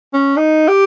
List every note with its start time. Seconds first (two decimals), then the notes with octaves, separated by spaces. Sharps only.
0.13 C#4
0.37 D#4
0.68 G4